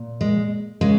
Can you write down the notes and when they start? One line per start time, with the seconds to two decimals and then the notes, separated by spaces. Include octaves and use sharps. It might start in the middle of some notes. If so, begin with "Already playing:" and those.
Already playing: A#2
0.21 G#3
0.81 C#3 G#3